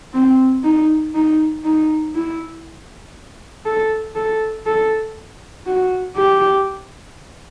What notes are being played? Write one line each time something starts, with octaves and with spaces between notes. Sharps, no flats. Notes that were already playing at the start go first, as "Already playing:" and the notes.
C4
D#4
D#4
D#4
E4
A4
A4
A4
F#4
G4